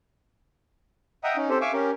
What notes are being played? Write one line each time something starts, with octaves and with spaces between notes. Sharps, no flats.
D#5 E5 F#5 G5 A#5 D#6
C#4 D#4
C4 G4 A4 C5
E5 F5 G#5 C#6 D6 E6
C#4 G4 A#4